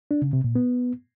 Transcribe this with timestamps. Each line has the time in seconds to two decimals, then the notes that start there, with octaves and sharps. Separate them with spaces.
0.11 D4
0.22 C#3
0.33 C3
0.44 A#2
0.56 B3